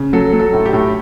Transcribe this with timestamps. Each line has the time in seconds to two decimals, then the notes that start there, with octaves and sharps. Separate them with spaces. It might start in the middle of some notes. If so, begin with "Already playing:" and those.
Already playing: C#3
0.13 F#3 A4
0.33 F#3
0.39 A4
0.53 A2
0.66 G4
0.73 A2